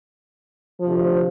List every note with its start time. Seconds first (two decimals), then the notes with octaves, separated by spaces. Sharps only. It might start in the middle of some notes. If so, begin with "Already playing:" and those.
0.81 D2 C3 F3